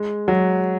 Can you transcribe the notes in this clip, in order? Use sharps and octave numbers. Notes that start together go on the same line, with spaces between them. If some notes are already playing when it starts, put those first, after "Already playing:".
Already playing: G#3
F#3